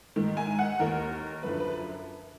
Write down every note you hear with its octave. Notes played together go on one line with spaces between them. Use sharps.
G#2 D#3
G#5
F#5
D#2 D#3 A#4
F#2 D3 F3 B4
B4